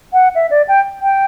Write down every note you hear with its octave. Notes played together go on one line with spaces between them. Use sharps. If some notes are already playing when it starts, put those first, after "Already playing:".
F#5
E5
D5
G5
G5